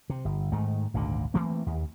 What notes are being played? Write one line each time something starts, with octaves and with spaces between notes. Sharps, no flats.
C3
G1
G#2 D#3 A3
G#1 D2 A#2 D3
E3 A3 A#3 C4
D#2